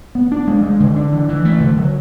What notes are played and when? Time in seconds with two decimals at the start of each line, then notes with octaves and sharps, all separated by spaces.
0.15 B3
0.32 D4
0.47 G#3
0.63 G#3
0.80 D3
0.96 D4
1.13 E3
1.29 E3
1.45 A3
1.60 D3
1.77 F#3